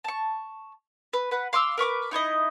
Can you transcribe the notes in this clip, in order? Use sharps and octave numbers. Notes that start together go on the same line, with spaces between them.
A5 C#6
B4
B4 F#5
F5 C6 D6 E6
A#4 B4 C#6 D6
D#4 E4 C#5 D#5